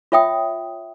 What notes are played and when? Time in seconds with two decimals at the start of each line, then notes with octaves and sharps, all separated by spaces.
0.12 F4 C#5 E5 G5 D#6